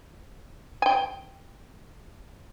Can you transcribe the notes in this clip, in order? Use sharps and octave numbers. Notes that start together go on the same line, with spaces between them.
G5 G#5